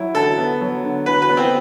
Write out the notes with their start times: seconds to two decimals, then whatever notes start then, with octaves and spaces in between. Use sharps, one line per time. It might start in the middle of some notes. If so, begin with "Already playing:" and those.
Already playing: F#3 E4
0.14 D3 A4
0.38 B3
0.61 F#3
0.84 D3
1.06 D3 B4
1.22 B4
1.29 B3
1.37 C4